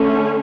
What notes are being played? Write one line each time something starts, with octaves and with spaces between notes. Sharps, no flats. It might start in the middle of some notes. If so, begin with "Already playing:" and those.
Already playing: D3 A3 C#4